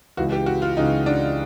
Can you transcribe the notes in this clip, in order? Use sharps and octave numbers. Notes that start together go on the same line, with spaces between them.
C#2 C#3 E3 F#4
G4
F#4
F4
C#2 C#3 E3 D#4
D4